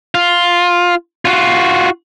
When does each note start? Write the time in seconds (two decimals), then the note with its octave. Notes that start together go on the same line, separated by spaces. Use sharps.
0.15 F4
1.25 F4 F#4